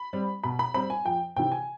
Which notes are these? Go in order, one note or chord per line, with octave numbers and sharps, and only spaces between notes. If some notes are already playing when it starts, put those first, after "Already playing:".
Already playing: B5
G3 C4
B2 B5
B5
G3 C4 B5
G#5
F2 G5
C3 E3 G5
G#5